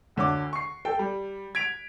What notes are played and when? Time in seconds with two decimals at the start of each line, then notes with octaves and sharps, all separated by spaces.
0.16 D2 D3 C#5 D6
0.53 C#6 C7
0.85 A4 G5
0.99 G3
1.55 G#6 B6 D7 F7